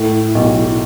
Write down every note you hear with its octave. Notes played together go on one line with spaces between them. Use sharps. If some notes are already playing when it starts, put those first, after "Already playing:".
Already playing: A2 E4
B1